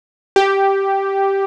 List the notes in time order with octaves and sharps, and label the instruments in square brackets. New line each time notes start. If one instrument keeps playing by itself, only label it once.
[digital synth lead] G4